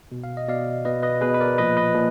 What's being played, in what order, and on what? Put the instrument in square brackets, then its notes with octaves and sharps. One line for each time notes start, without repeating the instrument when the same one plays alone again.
[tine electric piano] B2
F5
D#5
B2 D5 F5
B2 B4 D#5
B4 D#5
B2 G#4 B4
B4
A#4 D5
A#2 F3 B4 D#5
B4 D#5
A#2 F3